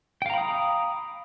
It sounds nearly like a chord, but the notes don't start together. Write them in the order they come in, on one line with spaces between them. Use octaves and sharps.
G5 F5 A#5 B5 D#6